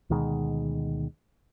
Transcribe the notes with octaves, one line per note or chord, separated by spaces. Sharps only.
D2 B2 D#3 G#3